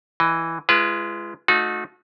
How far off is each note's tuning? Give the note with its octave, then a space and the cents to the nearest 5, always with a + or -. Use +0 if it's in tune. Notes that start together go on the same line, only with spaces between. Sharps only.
E3 +0 D#5 +0
G#3 +0 F4 -40 B4 +0
A3 -15 D#4 +0 F#4 -35